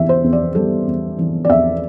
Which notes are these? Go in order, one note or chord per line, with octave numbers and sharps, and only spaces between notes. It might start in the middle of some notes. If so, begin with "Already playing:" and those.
Already playing: E2 E3 E5
C5
E2
D5
G3 A4
E2
E3
D5
E2 E5